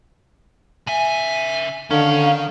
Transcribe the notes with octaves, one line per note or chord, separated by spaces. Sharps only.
C#3 E5 G#5
D3 D#3 C#4 F5